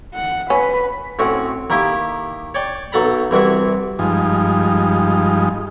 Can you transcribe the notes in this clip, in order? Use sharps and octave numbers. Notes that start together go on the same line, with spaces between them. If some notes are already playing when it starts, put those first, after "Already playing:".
F#5
C#4 B4
A2 C4 C#4 F#4
D#3 A#3 E4 G4
C#5 D5 G5
B1 F#3 A4 A#5 B5
C2 E3 C4 F#4 E5
G2 F3 G#3 D#4